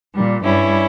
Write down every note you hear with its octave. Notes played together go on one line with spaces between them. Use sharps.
A#2 G3
G2 G3 C#4 E4